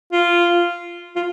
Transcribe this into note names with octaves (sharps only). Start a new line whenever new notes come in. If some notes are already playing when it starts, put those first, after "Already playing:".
F4
F4